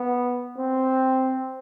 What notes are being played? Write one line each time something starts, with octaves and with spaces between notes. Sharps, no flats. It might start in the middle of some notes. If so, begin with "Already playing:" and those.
Already playing: B3
C4